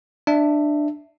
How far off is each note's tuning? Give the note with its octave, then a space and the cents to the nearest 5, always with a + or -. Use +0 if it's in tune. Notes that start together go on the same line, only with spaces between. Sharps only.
D4 +15 E5 +0